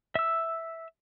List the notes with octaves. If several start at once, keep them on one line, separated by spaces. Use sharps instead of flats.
E5 E6